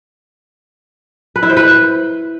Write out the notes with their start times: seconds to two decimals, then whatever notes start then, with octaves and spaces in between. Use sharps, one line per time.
1.36 B4
1.43 E4
1.50 C5
1.57 B4